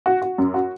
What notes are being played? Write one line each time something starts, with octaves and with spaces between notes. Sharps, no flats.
F#4
F#4
F#2
F#4